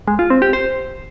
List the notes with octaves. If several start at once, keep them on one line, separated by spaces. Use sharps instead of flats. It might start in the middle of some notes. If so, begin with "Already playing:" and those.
G#3
F4
C4
G4
C5